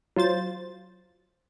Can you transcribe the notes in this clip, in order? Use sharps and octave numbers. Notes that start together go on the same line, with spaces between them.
F#3 F4 C5 A6